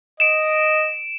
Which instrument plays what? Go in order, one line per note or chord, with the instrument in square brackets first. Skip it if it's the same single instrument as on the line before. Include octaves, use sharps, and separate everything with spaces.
[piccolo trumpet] D#5 [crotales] D7 E7